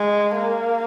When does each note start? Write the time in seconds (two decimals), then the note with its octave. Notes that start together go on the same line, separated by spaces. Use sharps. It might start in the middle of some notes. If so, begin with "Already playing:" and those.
Already playing: G#3
0.35 A#3